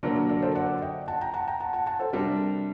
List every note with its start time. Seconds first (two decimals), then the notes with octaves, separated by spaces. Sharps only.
0.03 D3 F#3 A#3 A#4 D5
0.29 A#4 D5
0.42 A4 C5
0.55 D5 F#5
0.82 D#5 G5
1.08 F#5 A5
1.21 G5 A#5
1.34 F#5 A5
1.47 G5 A#5
1.60 F#5 A5
1.73 F#5 A5
1.86 F#5 A5
1.99 A4 C5
2.13 C3 G3 D4 G4 A#4